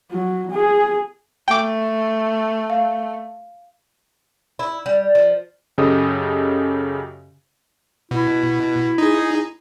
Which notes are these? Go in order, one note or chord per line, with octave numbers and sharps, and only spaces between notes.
F#3
G#4
A3 G5 D6
F5
E4
G3
F3
F#2 C#3 G4 A4 D#5 D#6
B2 E4
D#4 G#4